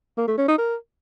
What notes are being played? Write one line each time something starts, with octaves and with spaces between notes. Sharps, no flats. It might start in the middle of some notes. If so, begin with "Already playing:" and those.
A#3
A3
C#4
D#4
A#4